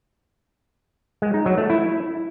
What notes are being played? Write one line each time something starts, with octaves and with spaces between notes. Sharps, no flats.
G#3
D#4
F#3
A3
E4